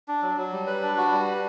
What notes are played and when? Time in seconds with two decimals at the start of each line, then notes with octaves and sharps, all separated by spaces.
0.08 D4
0.22 F#3
0.37 F#3
0.52 G3
0.67 B4
0.82 D4
0.97 F#4
1.12 G3
1.28 B4